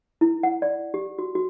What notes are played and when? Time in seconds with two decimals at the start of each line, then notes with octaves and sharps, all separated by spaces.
0.21 E4
0.43 F#5
0.62 D5
0.94 G4
1.19 F#4
1.35 F#4